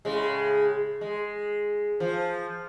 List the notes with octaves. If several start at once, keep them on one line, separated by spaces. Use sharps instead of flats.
A2 C#3 G#3
G#3
F3